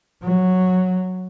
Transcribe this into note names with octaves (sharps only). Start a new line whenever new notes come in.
F#3